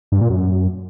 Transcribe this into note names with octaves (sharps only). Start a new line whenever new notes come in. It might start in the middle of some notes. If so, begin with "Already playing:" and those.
G2
A#2
F#2